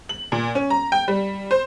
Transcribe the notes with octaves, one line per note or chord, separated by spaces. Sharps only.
F#7
A#2
C#4
A#5
G5
G3
C5